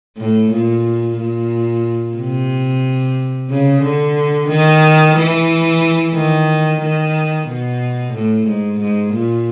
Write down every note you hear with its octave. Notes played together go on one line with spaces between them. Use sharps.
A2
A#2
A#2
C3
C#3
D3
D#3
E3
D#3
D#3
B2
A2
G#2
G#2
A#2